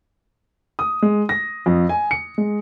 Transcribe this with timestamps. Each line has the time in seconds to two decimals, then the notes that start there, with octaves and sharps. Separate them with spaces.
0.79 D#6
1.02 G#3
1.29 A#6
1.66 F2
1.89 G#5
2.11 C#7
2.38 G#3